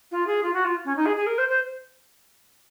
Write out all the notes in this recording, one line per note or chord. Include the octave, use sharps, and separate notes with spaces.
F4
G#4
F4
F#4
F4
C#4
D#4
G#4
G#4
A#4
C5
C5